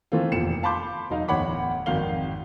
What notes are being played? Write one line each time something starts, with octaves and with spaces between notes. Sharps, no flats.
D#3 E3 A3 C4 F4
F1 E2 A#2 F3 C#7 E7
F5 A5 B5 C6 D6 G6
E1 F#3 D#4 F5
D1 E2 C#5 F#5 B5 D6
G#1 F2 D#3 F#4 F5 G7